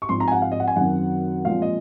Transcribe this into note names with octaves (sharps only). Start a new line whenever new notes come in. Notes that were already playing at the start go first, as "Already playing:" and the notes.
C#6
G#2 F3 C4 C6
A#5
G#5
F#5
F5
D#5
F#5
G#5
F#2 D#3 F#3 C4 F#5
A#2 F3 G#3 C4 F5
D#5